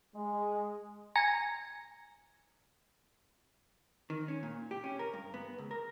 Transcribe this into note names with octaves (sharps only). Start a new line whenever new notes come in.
G#3
G#5 A#5 A#6 C#7
D#3
C#4
A#2
G4
C#4
A#4
G2
B3
C#2
A#4